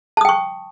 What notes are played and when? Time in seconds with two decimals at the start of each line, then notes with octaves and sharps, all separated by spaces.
0.17 A5
0.21 D#6
0.25 G5
0.29 C#6